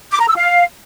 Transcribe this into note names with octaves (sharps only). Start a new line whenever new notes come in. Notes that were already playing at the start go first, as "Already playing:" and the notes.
D6
A#5
E6
F5